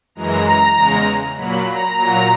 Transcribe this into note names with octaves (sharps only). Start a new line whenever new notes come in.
F#2 E3 G#3 A#5
E2 C#3 G#3
A#2 F#3 B5
A#5
A#2 F#3